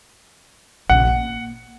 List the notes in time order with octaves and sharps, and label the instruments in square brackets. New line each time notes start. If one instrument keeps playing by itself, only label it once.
[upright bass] A#1 C#3 [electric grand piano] F#5
[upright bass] A#3